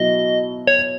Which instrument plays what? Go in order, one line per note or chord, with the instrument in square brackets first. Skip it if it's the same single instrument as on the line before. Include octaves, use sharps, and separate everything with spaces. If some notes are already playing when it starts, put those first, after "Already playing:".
Already playing: [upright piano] B2 F#3 E4 [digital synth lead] D#5
[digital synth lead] C#5